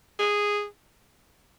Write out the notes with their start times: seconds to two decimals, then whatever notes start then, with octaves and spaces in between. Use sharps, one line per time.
0.19 G#4